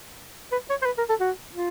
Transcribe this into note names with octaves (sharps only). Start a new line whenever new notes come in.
B4
C#5
C5
B4
A#4
A4
F#4
F4